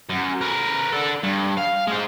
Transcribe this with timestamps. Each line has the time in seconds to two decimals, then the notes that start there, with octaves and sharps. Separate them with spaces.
0.09 F#2
0.41 A#4 B4
0.92 D4 A4
1.23 G2
1.57 F5
1.87 G#3 C5